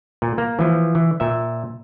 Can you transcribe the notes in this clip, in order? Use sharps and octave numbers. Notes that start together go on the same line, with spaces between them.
A#2
A#3
E3 F3
E3
A#2 E5